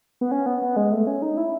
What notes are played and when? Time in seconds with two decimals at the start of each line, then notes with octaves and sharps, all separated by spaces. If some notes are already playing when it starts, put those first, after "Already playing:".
0.21 B3
0.31 C#4
0.46 B3
0.62 B3
0.76 G#3
0.92 A3
1.07 C#4
1.22 D#4
1.37 E4